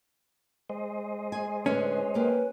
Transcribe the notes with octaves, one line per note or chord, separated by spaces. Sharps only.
G#3 C5 D#5
G#4 G#5
A2 D3 C#4 B4
A#3 G4 B4